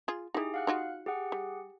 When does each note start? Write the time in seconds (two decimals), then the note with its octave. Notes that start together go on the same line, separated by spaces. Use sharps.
0.08 F4 G#4
0.34 D#4 E4 G4 G#4
0.54 F5 F#5 F#6
0.67 D#4 F4 F#4
1.06 G4 G#4 F#5
1.32 G3